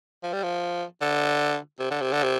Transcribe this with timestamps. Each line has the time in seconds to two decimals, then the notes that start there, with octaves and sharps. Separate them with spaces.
0.23 F3
0.33 G3
0.43 F3
1.02 D3
1.80 C3
1.91 D3
2.01 C3
2.13 D3
2.23 C3